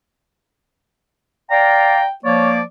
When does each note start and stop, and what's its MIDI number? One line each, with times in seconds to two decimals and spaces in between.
1.51 2.03 74
1.51 2.03 77
1.51 2.09 79
1.51 2.03 82
2.25 2.61 53
2.25 2.61 58
2.25 2.51 73
2.25 2.61 74